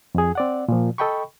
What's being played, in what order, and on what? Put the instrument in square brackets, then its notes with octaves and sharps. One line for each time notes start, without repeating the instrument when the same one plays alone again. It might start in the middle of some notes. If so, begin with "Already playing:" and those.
[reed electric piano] F2 G#4
C4 D5 F#5
A#2 F3
A4 D#5 G5 B5 C#6